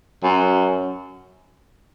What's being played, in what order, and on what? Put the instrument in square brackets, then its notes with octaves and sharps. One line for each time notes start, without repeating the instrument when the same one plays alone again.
[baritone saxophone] F#2